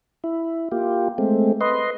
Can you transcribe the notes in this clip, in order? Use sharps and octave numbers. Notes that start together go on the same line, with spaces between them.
E4
A#3 F4 G4
G#3 A3 C4
B4 D#5 C6